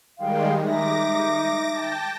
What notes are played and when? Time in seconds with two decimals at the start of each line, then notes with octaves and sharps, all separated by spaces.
0.18 D#3 G3 G#3 F5 G5 C6
0.65 D#4 E5 D6 A#6
1.70 G5 A5